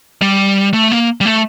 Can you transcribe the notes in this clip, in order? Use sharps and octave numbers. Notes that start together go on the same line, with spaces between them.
G3
A3
A#3
G3
A3